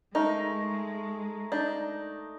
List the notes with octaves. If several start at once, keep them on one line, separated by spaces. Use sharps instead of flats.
G#3 A3 D#4 A#4
D4 D#4